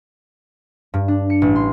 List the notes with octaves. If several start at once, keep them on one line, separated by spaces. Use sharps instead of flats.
G2
D4
C#7
A1
C6